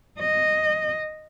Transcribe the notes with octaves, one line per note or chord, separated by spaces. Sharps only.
D#5